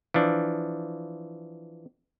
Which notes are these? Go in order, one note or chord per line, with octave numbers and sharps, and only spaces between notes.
E3 F3 D4